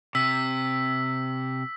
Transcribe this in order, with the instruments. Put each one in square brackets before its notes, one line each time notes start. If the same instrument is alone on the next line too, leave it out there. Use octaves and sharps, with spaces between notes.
[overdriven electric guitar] C3 [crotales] E6 B6